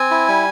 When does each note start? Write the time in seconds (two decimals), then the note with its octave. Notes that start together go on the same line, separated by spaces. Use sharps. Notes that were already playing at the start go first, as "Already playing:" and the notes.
Already playing: C4 G#5
0.11 E4
0.28 G3